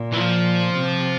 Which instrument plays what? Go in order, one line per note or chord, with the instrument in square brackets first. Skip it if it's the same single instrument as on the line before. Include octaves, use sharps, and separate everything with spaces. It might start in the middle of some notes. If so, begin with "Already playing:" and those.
Already playing: [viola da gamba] A#2
[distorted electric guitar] E3
F3
[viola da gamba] C3